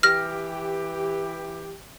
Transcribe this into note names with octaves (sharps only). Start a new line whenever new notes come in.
E3 G4 F6 A#6